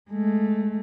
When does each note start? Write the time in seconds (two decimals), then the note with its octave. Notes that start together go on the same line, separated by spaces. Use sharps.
0.10 G#3 A3